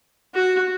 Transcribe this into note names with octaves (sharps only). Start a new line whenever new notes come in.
F#4